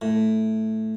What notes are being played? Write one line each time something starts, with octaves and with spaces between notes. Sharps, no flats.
A2